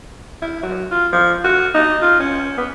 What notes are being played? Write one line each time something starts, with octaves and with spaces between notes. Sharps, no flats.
E4
F#3
F4
F3
F#4
D#4
F4
C#4
B3